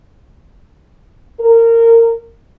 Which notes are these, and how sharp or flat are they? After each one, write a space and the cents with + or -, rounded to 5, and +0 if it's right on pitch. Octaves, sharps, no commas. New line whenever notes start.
A#4 -25